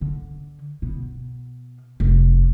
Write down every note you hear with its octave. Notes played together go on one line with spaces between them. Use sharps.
D3
B2
F1